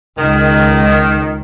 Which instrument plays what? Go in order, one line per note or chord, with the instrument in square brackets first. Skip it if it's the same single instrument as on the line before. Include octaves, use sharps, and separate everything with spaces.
[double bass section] C#2 [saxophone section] D#3